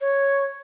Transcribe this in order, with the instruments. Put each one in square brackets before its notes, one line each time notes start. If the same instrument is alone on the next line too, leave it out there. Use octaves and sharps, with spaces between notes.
[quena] C#5